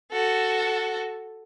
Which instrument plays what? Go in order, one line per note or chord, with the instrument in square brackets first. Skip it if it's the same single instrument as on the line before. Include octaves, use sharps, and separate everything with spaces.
[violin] F#4 A4